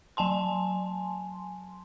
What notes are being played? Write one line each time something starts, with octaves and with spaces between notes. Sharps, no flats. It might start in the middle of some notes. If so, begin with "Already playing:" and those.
F#3 G#5 A5 C6